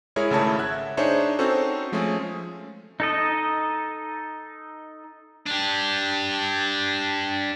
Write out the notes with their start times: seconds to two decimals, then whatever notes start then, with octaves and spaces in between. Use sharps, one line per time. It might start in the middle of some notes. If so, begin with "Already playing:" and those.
0.16 G#3 E4 G#4 A#4 C#5
0.30 G#1 C#3 A3 E4 C#5 A5
0.59 E5 F#5 F#6 G#6
0.97 D4 D#4 G#4 C5 C#5 E5
1.39 C4 C#4 D#4 F#4 A4 C5
1.92 F3 G#3 A3 C#4 G#4
3.00 D#4 A4 D#5
5.47 D4 G4